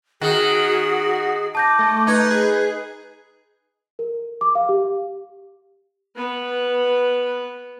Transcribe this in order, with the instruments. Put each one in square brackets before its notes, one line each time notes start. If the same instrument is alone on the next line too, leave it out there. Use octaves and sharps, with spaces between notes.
[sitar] D#3 [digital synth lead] F#4 [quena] G#4
[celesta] A5 G6 A#6 [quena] D6
[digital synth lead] A3
[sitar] D#4 [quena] B4 [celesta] G6 G#6
[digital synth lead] G#4
[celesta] A#4
D6
F5
G4
[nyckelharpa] B3 B4